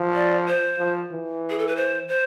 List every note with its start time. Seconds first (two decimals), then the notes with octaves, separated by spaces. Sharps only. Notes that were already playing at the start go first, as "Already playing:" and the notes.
Already playing: F3
0.14 D5
0.47 C5
0.79 F3
1.12 E3
1.50 G#4
1.59 A4
1.67 B4
1.76 C5
2.09 C5